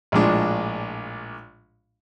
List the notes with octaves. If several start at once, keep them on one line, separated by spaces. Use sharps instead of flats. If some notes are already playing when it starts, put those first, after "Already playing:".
A#1 A2 F3 G#3 D4